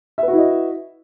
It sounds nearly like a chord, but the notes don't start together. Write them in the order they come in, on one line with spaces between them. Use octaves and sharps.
E5 B4 F#4 E4 D#5